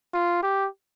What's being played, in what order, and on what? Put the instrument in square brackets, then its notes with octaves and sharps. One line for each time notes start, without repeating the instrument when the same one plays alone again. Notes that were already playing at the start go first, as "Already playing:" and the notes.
[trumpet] F4
G4